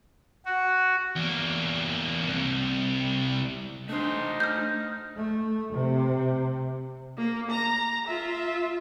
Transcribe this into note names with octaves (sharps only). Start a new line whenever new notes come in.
F#4
E2 A#3
C2
A3 D4 D#4 C5
F6 G6
A3
C3
A#3
A#5
F4 E5